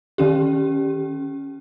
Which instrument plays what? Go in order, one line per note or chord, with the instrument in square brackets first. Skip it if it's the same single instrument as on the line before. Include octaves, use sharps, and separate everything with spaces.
[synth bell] D#3 C#4 G4